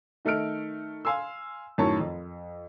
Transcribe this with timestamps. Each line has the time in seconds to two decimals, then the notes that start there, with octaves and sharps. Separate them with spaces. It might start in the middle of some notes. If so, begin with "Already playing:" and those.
0.25 D#3 A3 A4 D#5 F6 D7
1.05 F5 G#5 C6 E6
1.78 F#2 A2 D#3 C#5 A5
2.00 F2